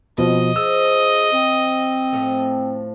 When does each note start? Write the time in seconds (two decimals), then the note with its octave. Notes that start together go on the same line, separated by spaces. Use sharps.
0.18 B2 F3 C4 D#5
0.56 F3 G#4 E6
1.33 C4
2.13 A2 F3 A3